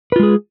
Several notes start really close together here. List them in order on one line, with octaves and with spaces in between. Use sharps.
B4 F4 G#3 G#4